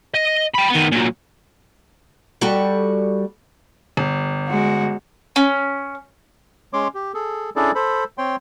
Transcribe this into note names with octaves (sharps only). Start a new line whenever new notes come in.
D#5
G5 B5
D#3 B3
A#2 F#3
G3 F#4 A4
G1
G#3 F#4
C#4
G#3 C#4 C#5 C6 D6
G4
G#4 A4
C#4 D4 E4 G#4 A4 D5
A4 C5 B5
C4 C#5 G5 C6